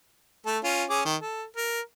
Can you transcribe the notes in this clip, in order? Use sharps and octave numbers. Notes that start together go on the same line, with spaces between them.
A3 A4
C#4 F4
C#4 G#4 D6
D#3
A4
A#4